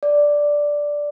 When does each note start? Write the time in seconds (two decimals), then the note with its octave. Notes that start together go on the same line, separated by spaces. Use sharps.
0.03 D5